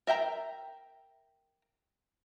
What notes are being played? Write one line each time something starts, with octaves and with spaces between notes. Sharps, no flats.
A#4 E5 G5 A#5